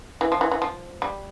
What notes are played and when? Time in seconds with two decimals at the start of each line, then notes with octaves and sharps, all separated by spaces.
0.21 E3
0.32 F3
0.41 E3
0.51 E3
0.62 F3
1.02 G3